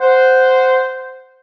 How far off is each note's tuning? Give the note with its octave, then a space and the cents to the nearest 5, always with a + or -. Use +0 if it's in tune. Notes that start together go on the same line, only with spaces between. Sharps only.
C5 -10 F#5 +0